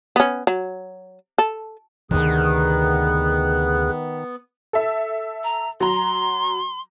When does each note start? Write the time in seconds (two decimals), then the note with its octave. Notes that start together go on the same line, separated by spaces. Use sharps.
0.16 B3 C#4
0.47 F#3
1.38 A4
2.11 D2 C3 D#3 B3 G#4 F#6
4.73 A4 E5
5.44 A#5
5.80 F#3 A#5 C6